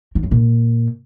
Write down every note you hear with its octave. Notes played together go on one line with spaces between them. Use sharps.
D#3
F#2
A#2